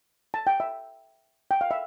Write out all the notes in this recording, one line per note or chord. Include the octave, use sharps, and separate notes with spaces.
A5
G5
E5
G5
F5
E5